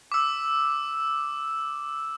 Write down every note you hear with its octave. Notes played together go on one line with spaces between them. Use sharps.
D6 E6